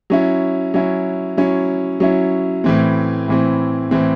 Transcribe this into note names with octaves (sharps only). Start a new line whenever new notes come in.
F#3 C#4 E4
F#3 C#4 E4
F#3 C#4 E4
F#3 C#4 E4
A2 E3 C4
A2 E3 C4
A2 E3 C4